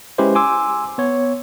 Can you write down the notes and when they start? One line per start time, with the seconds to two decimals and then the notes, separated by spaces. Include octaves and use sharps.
0.18 G#3 C#4 E4 G4 B4 C5
0.35 G#5 C6 D6 E6
0.98 B3 C#5